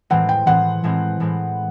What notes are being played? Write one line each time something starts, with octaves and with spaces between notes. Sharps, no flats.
A2 E3 G#3 C4 F#5
G5
A2 E3 G#3 C4 F#5
A2 E3 G#3 C4
A2 E3 G#3 C4